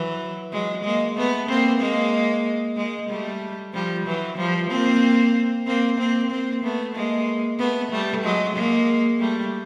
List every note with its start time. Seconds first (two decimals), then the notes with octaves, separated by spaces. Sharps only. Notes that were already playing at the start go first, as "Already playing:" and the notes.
Already playing: E3 F#3
0.52 F#3 G#3
0.84 G#3 A#3
1.17 A3 B3
1.48 A#3 C4
1.80 G#3 A#3
2.77 G#3 A#3
3.09 G3 A3
3.73 F3 G3
4.06 E3 F#3
4.37 F3 G3
4.70 A#3 C4
5.67 A#3 C4
5.99 A#3 C4
6.30 A#3 C4
6.63 A3 B3
6.95 G#3 A#3
7.59 A3 B3
7.91 G3 A3
8.24 F#3 G#3
8.56 G#3 A#3
9.20 G3 A3